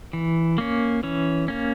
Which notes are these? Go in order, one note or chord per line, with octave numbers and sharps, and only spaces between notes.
E3
A#3 C#4
E3 C#4
A#3 C#4